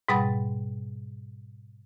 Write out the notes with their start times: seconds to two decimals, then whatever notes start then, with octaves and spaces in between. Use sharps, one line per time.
0.08 G#2 B2 G3 F#5 B5 A6